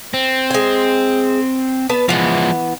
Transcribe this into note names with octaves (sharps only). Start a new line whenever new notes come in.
C4
G#3 G#5
B3 B4 A5
E3 F3 G#3 B3